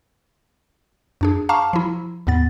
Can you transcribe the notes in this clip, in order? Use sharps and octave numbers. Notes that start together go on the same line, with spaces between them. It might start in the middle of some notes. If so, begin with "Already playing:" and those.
F#2 D4 G#4
F5 A5 A#5 C#6 D6 F6
F3 E4
D#2 G#2 B3 A6